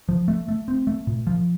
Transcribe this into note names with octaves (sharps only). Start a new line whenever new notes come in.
F3
A3
A3
C4
A3
A#2
F3